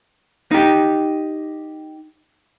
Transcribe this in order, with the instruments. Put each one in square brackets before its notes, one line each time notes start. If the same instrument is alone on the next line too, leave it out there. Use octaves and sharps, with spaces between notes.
[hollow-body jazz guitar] D#4 G4